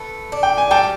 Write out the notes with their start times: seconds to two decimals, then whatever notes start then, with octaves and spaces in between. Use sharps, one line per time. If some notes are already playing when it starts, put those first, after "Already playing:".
Already playing: A3 B4
0.32 D4
0.43 G5
0.58 G#5
0.71 G3 G5 A5